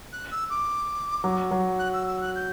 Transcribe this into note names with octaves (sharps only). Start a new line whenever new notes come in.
F#6
E6
D6
F#3
F#3
F#6
E6
E6
F#6
G6